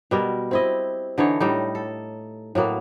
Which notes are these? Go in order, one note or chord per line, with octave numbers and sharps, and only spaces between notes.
B2 G3 A#4
C4 E4 D#5
D3 E3 D#4 C#5
A2 G3 D#4
A4
A2 F#3 A#3 B3